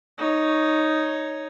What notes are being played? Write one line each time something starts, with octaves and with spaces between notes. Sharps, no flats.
D#4 C#5